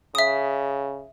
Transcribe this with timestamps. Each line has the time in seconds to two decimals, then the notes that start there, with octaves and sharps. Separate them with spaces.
0.15 C#3 E5 D#6